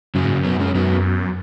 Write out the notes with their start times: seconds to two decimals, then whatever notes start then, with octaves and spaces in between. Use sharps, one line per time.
0.15 F#2 C#3 F#3
0.24 G#2
0.34 F#2
0.45 F#3 B3
0.60 G#3 C#4
0.75 F#2 F#3 B3